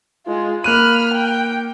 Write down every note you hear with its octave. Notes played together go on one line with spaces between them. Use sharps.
G#3 F4
A#3 B5 F6 F#6 D#7
G5